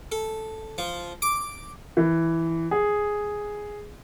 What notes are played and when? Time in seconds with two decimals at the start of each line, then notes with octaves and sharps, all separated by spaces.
0.12 A4
0.78 F3
1.22 D6
1.97 E3
2.71 G#4